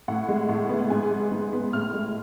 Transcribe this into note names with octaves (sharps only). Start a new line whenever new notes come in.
A2 F#5
G#3
A2
B3
G#2 G#5
G#3
G#2
B3
A2 F6
G#3